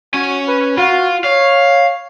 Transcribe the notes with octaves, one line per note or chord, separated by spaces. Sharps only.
C#4 F#4 G#5
B4
F4 F#4
C#5 F5